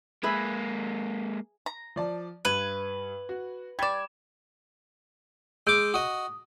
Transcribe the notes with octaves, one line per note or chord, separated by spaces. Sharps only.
G#3 A#3 G#4 B4 E5
A#5
F3 D5 A5
G2 B4 G#6
F#4
G3 D5 G#6 E7
G#3 D6 E6 G6 D7
F#4 D#5 D#6